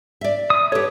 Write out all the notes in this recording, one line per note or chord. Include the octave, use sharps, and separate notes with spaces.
D5 E5
D#6
G4 A4 B4 C#5